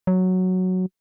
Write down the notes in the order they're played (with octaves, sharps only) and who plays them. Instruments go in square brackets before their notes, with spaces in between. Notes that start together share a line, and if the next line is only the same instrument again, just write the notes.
[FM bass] F#3